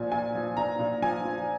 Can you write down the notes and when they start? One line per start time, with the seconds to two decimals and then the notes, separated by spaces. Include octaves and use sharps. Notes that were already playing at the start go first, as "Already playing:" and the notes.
Already playing: A#2 F3 G#5
0.12 A#2 G#5
0.35 F3
0.57 A#2 A#5
0.79 A#2
1.02 F3 G#5
1.25 F3